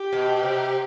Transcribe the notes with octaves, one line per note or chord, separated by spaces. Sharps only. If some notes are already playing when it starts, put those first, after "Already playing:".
Already playing: G4
B2
C3